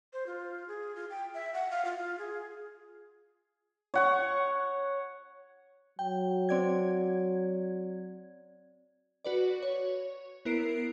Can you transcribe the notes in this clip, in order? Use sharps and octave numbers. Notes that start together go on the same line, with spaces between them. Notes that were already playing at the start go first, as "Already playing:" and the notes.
C5
F4
G#4
F4
G5
E5
F#5
F5
F4
F4
G#4
C#5 F#5 C#6
F#3 G5
C4 D5 G#6
F#4 B4 D5
C#5
B3 E4 A#4 C7 D7